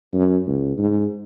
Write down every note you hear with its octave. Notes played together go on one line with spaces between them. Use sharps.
F#2
C#2
G#2